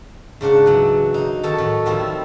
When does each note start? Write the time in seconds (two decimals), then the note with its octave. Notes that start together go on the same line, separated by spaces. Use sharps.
0.41 G#2 C#3 D4 F#5
0.66 E3 F#3
1.14 A#3 D#4
1.43 D#3 C#4 A4
1.58 A2
1.86 D#3 F3 G3 C4 E4 F4